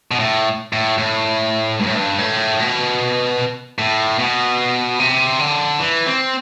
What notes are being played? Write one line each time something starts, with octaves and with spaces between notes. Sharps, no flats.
B2
A2
A2
A2
G2
A2
G2
A2
B2
A2
B2
C3
D3
E3
C4